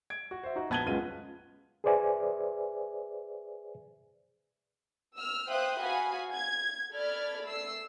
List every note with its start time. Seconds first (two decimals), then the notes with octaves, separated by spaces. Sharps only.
0.10 G#6 D7
0.31 F#4
0.44 C5 E5
0.56 D#4 F#4
0.70 A#1 B3 A5 G#6 D#7 G7
0.86 C#2 F#2 G#3 F4 B4 D#7
1.84 G#4 B4 C5 D5 E5 G#5
5.18 E6 F6
5.50 C5 E5 F5 G5 D#6 F#6
5.83 F#4 F5 G#5 B5 D#6
6.34 G#6
6.95 A4 D5 B5 F6 G#6
7.45 A3 E6 C7